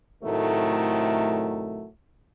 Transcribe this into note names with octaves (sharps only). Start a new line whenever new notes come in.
A2 C3 D#3 F#3 A3